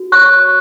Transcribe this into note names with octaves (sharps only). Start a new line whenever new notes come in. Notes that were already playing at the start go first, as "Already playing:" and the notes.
Already playing: F#4
C#5 C#6 F#6